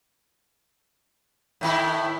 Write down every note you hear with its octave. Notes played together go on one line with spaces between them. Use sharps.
A2 D#3 E4